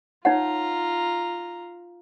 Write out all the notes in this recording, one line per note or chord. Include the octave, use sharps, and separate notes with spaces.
D#4 F4 C#5 F#5 A#5